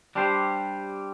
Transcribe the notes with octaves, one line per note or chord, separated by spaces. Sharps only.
G3 D4 G4 C5